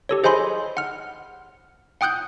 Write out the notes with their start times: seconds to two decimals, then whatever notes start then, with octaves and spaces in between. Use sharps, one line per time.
0.09 G4 A4 C#5
0.24 G#4 C5 D#5 G#5 B5 C6
0.77 F#5 F6
2.01 F#5 G5 D#6 F#6 G6